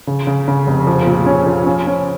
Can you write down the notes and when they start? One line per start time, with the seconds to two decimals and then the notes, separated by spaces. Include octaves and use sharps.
0.07 C#3
0.27 C#3
0.48 C#3
0.67 F1
0.87 F3
1.07 A#2
1.26 C#4
1.47 F3
1.66 C#4
1.87 C#4